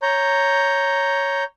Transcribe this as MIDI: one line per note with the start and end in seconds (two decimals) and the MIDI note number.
0.02 1.44 73
0.02 1.44 82
0.02 1.44 91